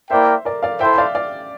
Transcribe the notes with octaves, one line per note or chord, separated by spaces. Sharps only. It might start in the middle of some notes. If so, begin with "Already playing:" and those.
A#3 E4 A#4 C5 D5 E5 G5
A#4 D5
D5 F5
E4 A4 C5 E5 G5
E5
D5 F5
D5 F5